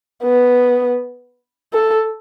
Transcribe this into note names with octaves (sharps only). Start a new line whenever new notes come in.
B3
A4